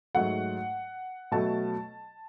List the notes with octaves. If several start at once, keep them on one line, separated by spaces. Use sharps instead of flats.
G#2 F#3 A3 F#5
B2 F#3 A3 A5